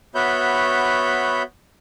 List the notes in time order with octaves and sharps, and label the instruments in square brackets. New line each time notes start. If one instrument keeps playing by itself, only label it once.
[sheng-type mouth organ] B3 F#4 C#5 E5 B5 G6